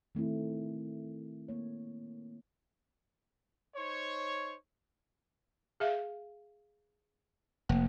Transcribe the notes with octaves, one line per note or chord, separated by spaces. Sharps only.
D#3 A3 C4 E4
A#3 C#5
D#4 C5 C#5
G#4 E5 F5
F1 A#3